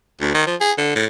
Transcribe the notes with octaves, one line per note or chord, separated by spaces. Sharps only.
D2
D#3
F3
G#4
D3
A2